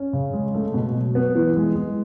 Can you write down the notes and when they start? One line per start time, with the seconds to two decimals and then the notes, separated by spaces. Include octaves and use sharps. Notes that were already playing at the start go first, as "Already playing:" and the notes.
Already playing: C#4
0.13 C#3
0.33 G#3
0.54 A3
0.74 B2
0.95 F#3
1.15 B3
1.35 E3
1.56 G#3
1.75 G#3